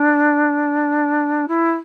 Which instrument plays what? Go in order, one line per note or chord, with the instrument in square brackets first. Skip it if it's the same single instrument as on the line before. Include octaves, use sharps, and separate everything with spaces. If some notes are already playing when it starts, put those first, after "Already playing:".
Already playing: [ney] D4
E4